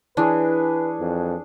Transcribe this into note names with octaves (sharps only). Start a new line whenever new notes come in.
E3 D4 G#4 B4 C#5
F2